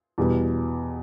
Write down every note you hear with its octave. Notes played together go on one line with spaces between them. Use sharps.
E2 B2 G3 B3